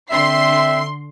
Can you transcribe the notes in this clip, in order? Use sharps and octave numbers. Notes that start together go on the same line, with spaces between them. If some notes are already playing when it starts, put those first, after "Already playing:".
D3 C4 D4 E5 C6 C7